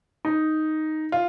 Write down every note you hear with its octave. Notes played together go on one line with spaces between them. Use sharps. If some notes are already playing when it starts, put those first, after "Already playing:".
D#4
F4